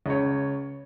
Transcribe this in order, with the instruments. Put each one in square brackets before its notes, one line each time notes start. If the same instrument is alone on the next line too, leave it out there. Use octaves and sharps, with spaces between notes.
[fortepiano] C#2 C#5